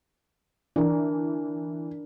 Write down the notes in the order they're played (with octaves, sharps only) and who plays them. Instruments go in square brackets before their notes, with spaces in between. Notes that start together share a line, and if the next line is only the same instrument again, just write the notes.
[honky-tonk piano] E3 [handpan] D4 A#4